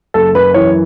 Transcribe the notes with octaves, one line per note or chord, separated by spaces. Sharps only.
F#1 A4
F#2 B4
E3 C#5